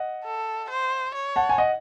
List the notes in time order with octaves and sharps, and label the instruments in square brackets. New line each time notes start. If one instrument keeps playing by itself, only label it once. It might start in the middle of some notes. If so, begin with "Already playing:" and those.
Already playing: [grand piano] D#5 F#5
[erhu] A4
C5
C#5
[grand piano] F#5 A5
G#5
D#5 F#5